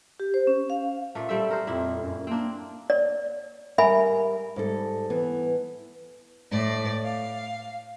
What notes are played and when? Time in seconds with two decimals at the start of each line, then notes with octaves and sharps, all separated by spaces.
0.20 G4
0.34 C5
0.47 C#4
0.70 F5
1.15 A#2 A3
1.29 G3 C4 A4 E5
1.50 A#4 C5
1.67 F2 A#2 E4
2.01 F#2
2.27 A#3 C4 D4
2.90 D5
3.78 G3 A#4 E5 G#5 B5
4.56 G#2 G3 A4
5.10 E3 B3
6.51 A2 D5
7.04 F5